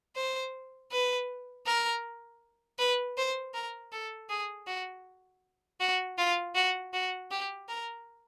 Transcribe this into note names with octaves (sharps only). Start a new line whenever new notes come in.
C5
B4
A#4
B4
C5
A#4
A4
G#4
F#4
F#4
F4
F#4
F#4
G4
A#4